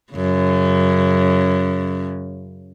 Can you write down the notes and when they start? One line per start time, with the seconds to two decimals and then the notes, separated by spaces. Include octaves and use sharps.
0.13 F#2 C#3